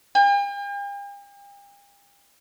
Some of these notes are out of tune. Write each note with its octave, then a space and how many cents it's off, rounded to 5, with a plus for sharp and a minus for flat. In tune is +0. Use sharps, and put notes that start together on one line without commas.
G5 +45